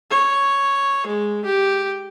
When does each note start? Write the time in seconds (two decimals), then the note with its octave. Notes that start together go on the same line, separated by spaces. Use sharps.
0.10 C#5
1.07 G#3
1.45 G4